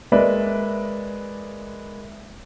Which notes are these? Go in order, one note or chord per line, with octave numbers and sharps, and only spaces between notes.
G#3 A#3 B4 D5 E5